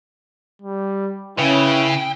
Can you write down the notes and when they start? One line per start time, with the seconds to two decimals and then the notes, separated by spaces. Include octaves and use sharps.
0.62 G3
1.39 C#3 C#4 E4 B4 G5